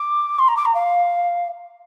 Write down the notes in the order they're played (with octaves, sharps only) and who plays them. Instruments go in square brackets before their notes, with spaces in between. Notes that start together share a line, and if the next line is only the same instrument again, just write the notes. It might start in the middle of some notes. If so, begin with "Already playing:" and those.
Already playing: [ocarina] D6
C6
A#5
D6
A#5
F5